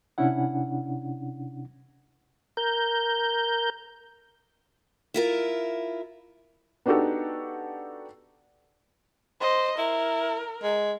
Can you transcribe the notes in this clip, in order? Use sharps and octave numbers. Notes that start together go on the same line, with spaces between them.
C3 C#4 D4 E4 F#5
A#4 G6
E4 F4 A#4
B3 D4 D#4 F#4 G4 A4
C5 D#5
E4 A#4
G#3